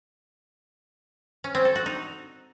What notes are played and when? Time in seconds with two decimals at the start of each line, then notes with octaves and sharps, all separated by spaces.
1.44 C#4
1.55 C4
1.65 A4
1.75 F#4
1.86 D#4